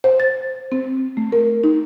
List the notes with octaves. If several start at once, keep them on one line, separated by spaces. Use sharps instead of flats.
C5
A6
C4
A3
A#4
D#4